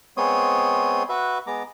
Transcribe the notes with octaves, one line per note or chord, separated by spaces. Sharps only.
G#3 B3 C4 C#5 C6 D#6
F#4 B4 E5
G#3 B3 A#5 D6